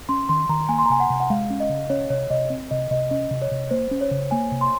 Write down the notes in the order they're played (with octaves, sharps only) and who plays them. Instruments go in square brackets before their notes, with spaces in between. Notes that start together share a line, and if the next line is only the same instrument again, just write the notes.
[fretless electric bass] C#4 [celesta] C6
[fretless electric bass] D#3 [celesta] C6
[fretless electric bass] D#3 [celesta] A#5
[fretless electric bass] A#3 [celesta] G#5
[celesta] C6
A#5
[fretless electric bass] C3 [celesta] G#5
[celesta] F#5
[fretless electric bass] C3
[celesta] F#5
[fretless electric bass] G#3 [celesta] F5
[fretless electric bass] C#4
[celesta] D#5
[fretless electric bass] C#3
[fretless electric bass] C#4 [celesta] C#5
[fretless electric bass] C3 [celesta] C#5
[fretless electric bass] C3 [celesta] D#5
[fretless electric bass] C4
[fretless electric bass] C3 [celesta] D#5
[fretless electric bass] C3 [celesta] D#5
[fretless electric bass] C#4 [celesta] D#5
[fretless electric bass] C3
[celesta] C#5
[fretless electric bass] C3
[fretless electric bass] A#3 [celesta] C5
[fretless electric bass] C#4
[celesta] C#5
[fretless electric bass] C#3
[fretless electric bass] A#3 [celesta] G#5
[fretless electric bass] C3
[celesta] C6